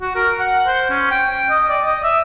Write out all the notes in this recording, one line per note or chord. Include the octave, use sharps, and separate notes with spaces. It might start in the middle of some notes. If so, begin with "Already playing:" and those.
F#4
A#4
F#5
C5
C#4
G5
D#5
D5
D#5
E5